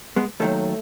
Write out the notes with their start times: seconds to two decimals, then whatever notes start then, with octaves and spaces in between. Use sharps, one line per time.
0.16 G#3 B3
0.40 D#2 D#3 F#3 A3